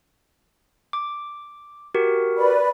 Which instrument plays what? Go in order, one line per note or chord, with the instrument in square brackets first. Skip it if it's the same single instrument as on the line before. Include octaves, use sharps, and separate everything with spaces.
[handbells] D6
F#4 G4 A#4
[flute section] B4 D5 B5